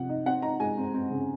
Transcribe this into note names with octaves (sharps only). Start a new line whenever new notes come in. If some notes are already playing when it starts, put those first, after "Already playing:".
Already playing: C3 F3 C4 F#5
D#4
C4 F#5
D#4 A#5
G#3 G#5
C4
C4
C#3